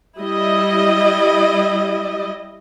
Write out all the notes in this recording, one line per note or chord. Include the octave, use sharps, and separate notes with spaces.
G3 E4 D#5